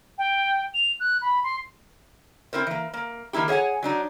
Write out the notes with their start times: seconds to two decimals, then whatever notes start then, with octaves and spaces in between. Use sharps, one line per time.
0.18 G5
0.74 F7
1.00 F#6
1.22 B5
1.44 C6
2.53 C4 E4 A#4 C5
2.67 E3 A#3
2.94 A#3
3.33 D#3 A#3 E4 G4
3.48 G#4 C#5 E5 F#5 G#5
3.83 F#3 D4 D#4